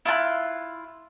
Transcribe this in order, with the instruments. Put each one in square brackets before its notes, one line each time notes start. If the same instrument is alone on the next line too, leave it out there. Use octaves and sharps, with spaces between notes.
[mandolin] E4 F4 A5 F#6